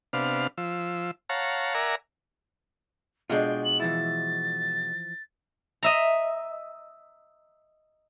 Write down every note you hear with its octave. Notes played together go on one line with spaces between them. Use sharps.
C3 B3 D4 F5 F6
F3 E6
C#5 F5 F#5 A5 A#5
A#4 D5 E5 F#5 G#5 A#5
B2 G#3 D4 F4 G5
F#7
E3 F3 E4 A6
D#5 E5 A#5